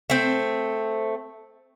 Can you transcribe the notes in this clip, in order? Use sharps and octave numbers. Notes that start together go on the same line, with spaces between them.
A3 C4